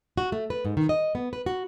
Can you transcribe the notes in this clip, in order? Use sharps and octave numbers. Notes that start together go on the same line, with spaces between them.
F#4
A3
B4
G#2
D#3
D#5
B3
B4
F#4